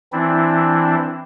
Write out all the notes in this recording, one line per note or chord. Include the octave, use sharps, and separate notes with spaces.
E3 C4 D4 E4